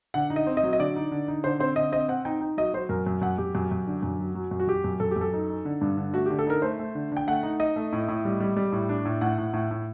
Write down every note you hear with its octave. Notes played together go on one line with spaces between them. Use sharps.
D3 F#5
D#4
D#5
C4
D#5
F#3
D#5
D3 D5
D#4
D3
D#4
D3 C5
C4 C5
D3 D#5
C4 D#5
C4 F#5
D#4 G5
D#4
F#3 D#5
F#3 C5
F#2 A#4
F#2
F#2 F#5
F#2 G4
F#2
F#2
D3
F#2
F#3
F#3
F#2
F#4
F#2 G4
F#2
F#2 A4
G4
F#2 A4
D#4
D#4
D3
G2
D3
A3 F#4
D3 G4
A4
D#4 A#4
A3 C5
A3
D3
D3 G5
A3 F#5
D#4
D#4 D#5
A3
A2
A2
G3
G3
G3
A2
D4
A2
A2 F#5
A2
A2
A2